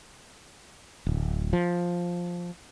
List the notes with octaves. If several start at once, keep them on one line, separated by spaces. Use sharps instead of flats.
D1
F3